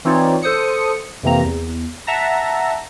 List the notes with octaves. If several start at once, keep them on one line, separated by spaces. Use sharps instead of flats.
E3 C4 D#4 F4 C#5 D5
A4 C5 D#6 C#7
F2 C3 E3 A#3 C4 A#5
E2
E5 F#5 A5 A#5 A#6